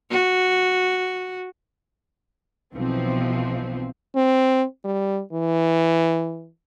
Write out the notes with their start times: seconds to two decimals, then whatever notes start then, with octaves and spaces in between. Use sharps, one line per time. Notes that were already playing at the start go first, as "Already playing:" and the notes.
0.11 F#4
2.75 B1 B2 E3 F3 C4
4.16 C4
4.84 G3
5.33 E3